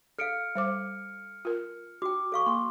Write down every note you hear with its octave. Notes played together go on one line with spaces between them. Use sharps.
A4 F5 F6 C#7 D7
G3 C5 D6
F4 A#4
F#4 G5 D6
A4 F5 C#6
A#3 C6